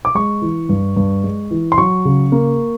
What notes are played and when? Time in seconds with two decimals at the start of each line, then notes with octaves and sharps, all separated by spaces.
0.05 D6
0.15 G#3 C#6
0.42 E3
0.69 G2
0.96 G2
1.24 G#3
1.51 E3
1.72 C6
1.78 F#3 C#6
2.05 C#3
2.32 A#3